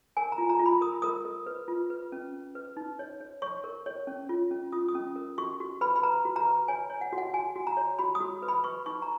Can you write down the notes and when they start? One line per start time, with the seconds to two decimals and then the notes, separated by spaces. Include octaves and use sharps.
0.17 A#4 G#5
0.32 A#5
0.38 F4
0.49 A#5
0.59 F4
0.66 B5
0.81 A#4 D#6
1.02 A#4 D#6
1.25 A#4
1.46 B4
1.68 F4
1.90 B4
2.12 C#4
2.34 C#4
2.55 B4
2.77 D#4
2.99 C#5
3.21 C#5
3.42 C#5 C#6
3.64 A#4
3.86 C#5
4.07 C#4
4.29 F4
4.51 C#4
4.72 F4 D#6
4.88 D#6
4.95 C#4
5.16 A#4
5.38 F#4 C#6
5.60 F#4
5.81 B4 B5
5.96 B5
6.03 B4 A#5
6.25 F#4
6.36 A#5
6.46 B4
6.68 C#5 G#5
6.90 C#5
7.01 F#5
7.13 F#4
7.18 F#5
7.33 F#4 G#5
7.56 F#4
7.67 A#5
7.77 C#5
7.99 F#4 B5
8.15 D#6
8.20 F#4
8.43 B4
8.48 B5
8.64 B4 C#6
8.86 D#4 C#6
9.02 A#5